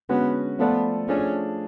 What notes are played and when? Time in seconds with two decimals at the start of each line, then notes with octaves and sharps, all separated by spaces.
0.09 D3 G#3 B3 C#4 F#4 B4
0.59 F3 A3 B3 F4 A4 D5
1.08 F3 A3 C#4 D4 G#4